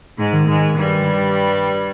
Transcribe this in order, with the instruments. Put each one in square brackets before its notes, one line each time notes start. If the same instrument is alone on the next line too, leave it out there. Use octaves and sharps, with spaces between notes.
[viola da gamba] G#2 G#3
[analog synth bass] D#3
[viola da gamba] G#2 G#3
G2 G3